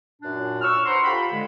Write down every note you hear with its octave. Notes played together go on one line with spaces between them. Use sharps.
F#2 A#2 D4
C#6 E6 F6
B4 C5 F#5 A#5 C6
F4 G4 A4 G5 B5
D3 G#3